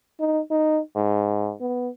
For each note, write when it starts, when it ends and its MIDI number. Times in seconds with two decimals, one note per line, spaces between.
0.20 0.41 63
0.51 0.80 63
0.96 1.53 44
1.61 1.89 59